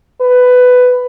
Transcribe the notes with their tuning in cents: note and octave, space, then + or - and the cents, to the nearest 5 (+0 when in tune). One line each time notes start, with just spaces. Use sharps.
B4 +15